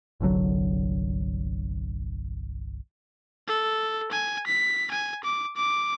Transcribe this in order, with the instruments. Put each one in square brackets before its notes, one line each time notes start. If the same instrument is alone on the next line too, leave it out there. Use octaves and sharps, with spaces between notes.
[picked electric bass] G1 C2 D3 F#3
[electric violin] A4
G#5
B6
G#5
D6
D6